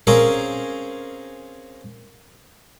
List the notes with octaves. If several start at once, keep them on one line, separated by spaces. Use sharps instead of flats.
C4 C#4 G#4 A#4 F5